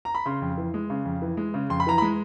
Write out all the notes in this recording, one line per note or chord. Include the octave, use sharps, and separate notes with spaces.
A#5
B5
C#3 C6
F2
E3
G#3
C#3
F2
E3
G#3
C#3
F2 C6
B5
E3 A#5
B5
G#3